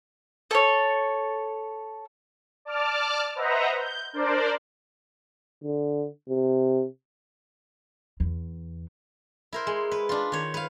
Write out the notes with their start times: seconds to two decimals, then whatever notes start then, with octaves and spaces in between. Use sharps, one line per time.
0.51 A4 C#5
2.65 D5 A5 D6 F6
3.35 B4 C5 D#5 E5 F#5 A#5
3.77 G6
4.13 D4 A#4 C5 D5
5.64 D3
6.29 C3
8.20 E2
9.53 E4 A#4 C5
9.67 G#3
9.91 B4
10.09 D4 F4
10.32 D#3 C#5
10.54 B4 F5